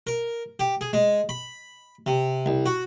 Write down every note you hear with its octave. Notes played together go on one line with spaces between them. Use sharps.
A#4
G4
G#4
G#3
B5
C3
C2
F#4